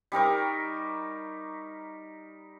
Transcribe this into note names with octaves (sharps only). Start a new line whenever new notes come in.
G3 D#4 A#4 C#6